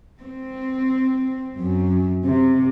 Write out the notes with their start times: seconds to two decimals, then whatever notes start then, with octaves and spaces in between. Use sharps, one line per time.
0.21 C4
1.59 F#2
2.24 C3